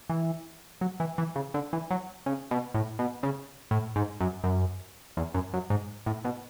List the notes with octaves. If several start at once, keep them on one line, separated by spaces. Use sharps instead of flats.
E3
F#3
E3
E3
C#3
D3
E3
F#3
C#3
B2
A2
B2
C#3
A2
G#2
F#2
F#2
E2
F#2
F#2
G#2
A2
B2